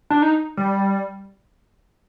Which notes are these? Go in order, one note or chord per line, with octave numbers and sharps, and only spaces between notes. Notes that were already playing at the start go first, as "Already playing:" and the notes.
D4
D#4
G3